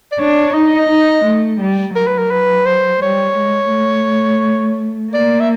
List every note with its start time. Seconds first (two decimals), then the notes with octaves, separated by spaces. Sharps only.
0.12 D5
0.19 D4 C#5
0.54 D#4 D#5
0.89 D#4
1.25 A3
1.60 G3
1.95 F#3 A#4
2.07 B4
2.18 A#4
2.31 B4
2.66 C5
3.02 G3 C#5
3.36 G#3
3.73 A3
5.13 A#3 D5
5.40 E5